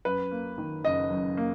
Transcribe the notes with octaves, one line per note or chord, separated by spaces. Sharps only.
F#2 B4
A#3
D#3
F#1 D#5
F#2
A#3